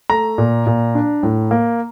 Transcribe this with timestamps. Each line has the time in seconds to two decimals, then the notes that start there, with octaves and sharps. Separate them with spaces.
0.10 A3 A#5
0.38 A#2
0.67 A#2
0.95 D4
1.23 A2
1.51 A#3